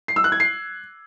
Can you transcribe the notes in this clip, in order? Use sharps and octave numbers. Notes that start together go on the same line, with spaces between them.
C7
E6
F#6
G#6
C7